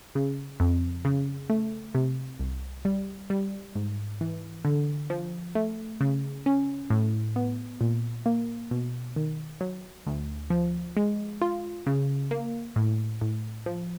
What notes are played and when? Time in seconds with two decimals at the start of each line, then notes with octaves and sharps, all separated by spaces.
0.15 C#3
0.60 F2
1.05 C#3
1.50 A3
1.95 C3
2.39 C2
2.85 G3
3.30 G3
3.75 G#2
4.21 E3
4.65 D3
5.10 F3
5.55 A3
6.01 C#3
6.46 C#4
6.90 A2
7.36 B3
7.81 A#2
8.26 A#3
8.71 B2
9.16 D#3
9.61 F#3
10.07 D2
10.50 F3
10.97 G#3
11.42 F4
11.86 C#3
12.31 A#3
12.76 A2
13.21 A2
13.66 F3